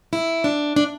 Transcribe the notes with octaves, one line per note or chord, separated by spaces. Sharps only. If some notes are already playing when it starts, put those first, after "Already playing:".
E4
D4
D4